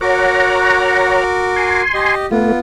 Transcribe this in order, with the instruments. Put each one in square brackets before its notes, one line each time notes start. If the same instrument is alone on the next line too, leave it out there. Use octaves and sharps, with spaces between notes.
[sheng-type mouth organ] F#4 A#4 D6 [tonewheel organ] C#5 F#5 A#5
[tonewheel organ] G#5 C6
[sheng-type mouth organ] G4 D#5
[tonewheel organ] A3 [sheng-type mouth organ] B3 F4